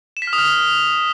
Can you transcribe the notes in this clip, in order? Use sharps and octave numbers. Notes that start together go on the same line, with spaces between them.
E7
B6
F6
D#6
F6